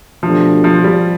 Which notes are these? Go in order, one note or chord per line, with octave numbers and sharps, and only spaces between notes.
B2 F3 A3 D4 G4
F3
G3